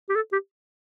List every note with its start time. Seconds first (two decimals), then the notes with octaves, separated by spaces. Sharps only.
0.09 G4
0.16 A4
0.32 G4